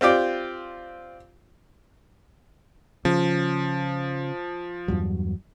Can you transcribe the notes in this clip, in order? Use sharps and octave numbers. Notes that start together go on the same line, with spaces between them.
C4 F4 G4 D5
C#3 F3
E2 G2 F#3